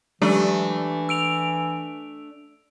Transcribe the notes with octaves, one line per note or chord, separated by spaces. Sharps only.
E3 F#3 G#3 A3 D4 G4
E6 D7 F7